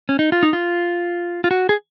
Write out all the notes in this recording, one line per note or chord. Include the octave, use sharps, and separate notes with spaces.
C#4
D#4
F4
D#4
F4
F4
F#4
G#4